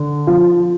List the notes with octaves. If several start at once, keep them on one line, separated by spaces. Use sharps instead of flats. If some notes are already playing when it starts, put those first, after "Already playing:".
Already playing: D3
F3